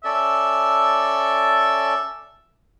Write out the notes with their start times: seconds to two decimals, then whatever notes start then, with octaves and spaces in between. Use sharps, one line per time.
0.04 C#4 A4 D5 E5